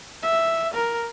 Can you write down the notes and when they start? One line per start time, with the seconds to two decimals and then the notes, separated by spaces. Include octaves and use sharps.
0.22 E5
0.74 A#4